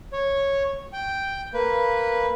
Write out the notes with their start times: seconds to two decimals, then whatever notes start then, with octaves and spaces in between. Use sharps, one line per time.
0.13 C#5
0.93 G5
1.54 A#3 B4